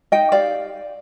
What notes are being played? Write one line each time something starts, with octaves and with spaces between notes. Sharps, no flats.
D#4 D#5 G5
G4 D5 F5